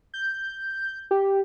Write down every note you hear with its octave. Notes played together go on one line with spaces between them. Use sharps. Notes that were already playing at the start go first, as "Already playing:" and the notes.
G6
G4